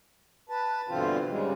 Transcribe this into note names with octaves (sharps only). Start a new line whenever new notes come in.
B4 A5
G2 B2 D3 E3 C4 F4
G#2 C#3 G3 G#3